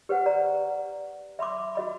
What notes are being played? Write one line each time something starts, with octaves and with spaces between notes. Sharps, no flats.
G4 B4 C5 F#5
D5 A#5
E5 B5 C6 D6
F#4 D#5 B5